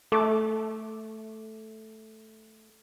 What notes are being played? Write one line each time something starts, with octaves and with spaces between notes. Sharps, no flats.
A3 A4 C#6 D6